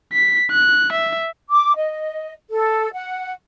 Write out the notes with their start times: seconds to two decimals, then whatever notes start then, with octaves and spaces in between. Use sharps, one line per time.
0.13 B6
0.51 F#6
0.93 E5
1.50 D6
1.75 D#5
2.49 A4
2.93 F#5